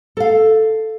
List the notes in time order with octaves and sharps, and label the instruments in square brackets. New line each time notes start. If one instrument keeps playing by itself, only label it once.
[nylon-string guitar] A4 F5